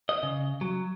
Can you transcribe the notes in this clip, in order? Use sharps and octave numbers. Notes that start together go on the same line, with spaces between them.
D#5
C#3
F#3